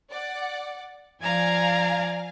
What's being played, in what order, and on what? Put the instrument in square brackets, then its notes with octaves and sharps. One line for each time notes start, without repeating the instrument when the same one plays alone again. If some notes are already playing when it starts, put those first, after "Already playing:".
[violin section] D5 F#5
[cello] F3 D5 [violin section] F5 G#5 [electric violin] A#5 G#6